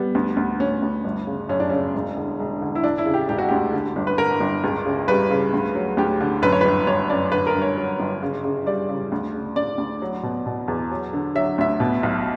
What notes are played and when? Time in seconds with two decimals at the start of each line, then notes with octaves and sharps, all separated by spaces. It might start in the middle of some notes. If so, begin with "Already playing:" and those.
Already playing: G3 B3
0.15 D2
0.37 D2
0.60 D2 C#4
0.82 D2
1.04 G1
1.27 C#3
1.49 F#2 C#4
1.60 D4
1.70 C#3 C#4
1.95 E1
2.17 D3
2.40 E1
2.62 D3
2.75 E4
2.84 E1 D4
2.98 E4
3.06 C#3
3.14 G4
3.29 E1 G4
3.38 F#4
3.49 D2 G4
3.73 D3
3.96 G1
4.07 B4
4.18 D3 A#4
4.40 G1
4.64 C#2
4.86 C#3
5.08 G3 B4
5.31 C#3
5.53 D2
5.75 F#3
5.97 D2 G4
6.21 D3
6.42 F#2 B4
6.52 C#5
6.61 G1 B4
6.87 G1 C#5
7.10 F#2 D5
7.32 D3 B4
7.47 A#4
7.55 G2
7.62 C#5
7.77 F#3
8.00 G1
8.22 C#3
8.44 C#3
8.66 G3 D5
8.89 C#3
9.12 D2
9.34 C#3
9.56 D2 D5
9.78 D2
10.02 F#3
10.23 B2
10.46 B2
10.68 E2
10.91 F#3
11.13 D3
11.35 F#3 E5
11.58 D2 E5
11.80 B2
12.03 B1